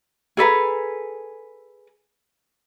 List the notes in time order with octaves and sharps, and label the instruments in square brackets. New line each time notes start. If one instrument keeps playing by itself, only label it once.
[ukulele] G#4 A4 B4 A#5